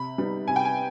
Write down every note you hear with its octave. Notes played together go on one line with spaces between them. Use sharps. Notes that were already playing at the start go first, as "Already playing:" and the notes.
Already playing: C3 B5
G3 B3 D#4
C3 G#5
G5
G#5